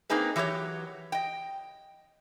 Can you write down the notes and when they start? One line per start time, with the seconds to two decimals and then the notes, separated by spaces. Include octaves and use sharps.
0.10 A#3 C4 D#4 G#4 B4
0.36 E3 F#3 G4 C5 C#5
1.12 D#5 G5